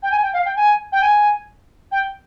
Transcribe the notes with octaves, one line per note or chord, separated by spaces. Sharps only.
G5
G#5
G5
F5
G5
G#5
G5
G#5
G5